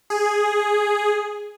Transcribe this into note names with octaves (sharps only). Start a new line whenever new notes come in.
G#4